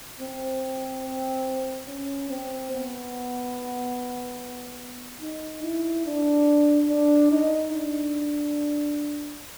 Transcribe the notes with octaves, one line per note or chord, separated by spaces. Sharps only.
C4
C#4
C4
B3
D#4
E4
D4
D4
D#4
D4